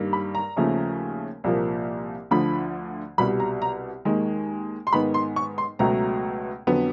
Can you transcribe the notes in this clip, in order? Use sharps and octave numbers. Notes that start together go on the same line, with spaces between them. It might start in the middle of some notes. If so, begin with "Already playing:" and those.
Already playing: G2 D#3 G3 A#3
B5
A#5
D#2 C#3 F3 A3
C2 A#2 F3 A#3
D2 D3 F3 B5
C2 B2 G3 B5
A#5
A#5
D#2 D#3 G#3
C6
G#2 D#3 G#3 B3 B5
C6
C#6
C6
C#2 B2 F#3 A3 A#5
F2 D3 F#3 B3